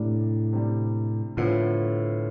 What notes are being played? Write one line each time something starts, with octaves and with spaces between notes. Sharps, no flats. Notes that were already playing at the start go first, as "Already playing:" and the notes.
Already playing: A2 C3 G3 D4
C3 G3 D4
A2 D3 F3 B3 F4